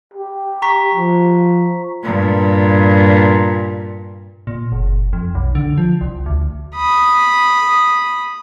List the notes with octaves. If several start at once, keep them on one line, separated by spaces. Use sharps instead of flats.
G4
A#5 C#6 B6
F3
G2 A#2
A#2
F#1
F2
B1
D3
F3
C2
D2
B5 D#6